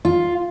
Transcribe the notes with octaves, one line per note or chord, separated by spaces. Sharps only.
F4